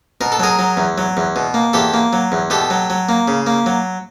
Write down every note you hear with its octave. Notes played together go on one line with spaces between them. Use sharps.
B2 A#4
A4
F#3 G#4 A#4
F#3
E2
F#3
E2
B2
A#3
E2 G4 A4
A#3
F#3
E2
B2 G4 A4
F#3
F#3
A#3
C#3
A#3
F#3